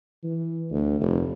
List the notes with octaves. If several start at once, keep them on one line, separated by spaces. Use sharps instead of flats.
E3
D2
F1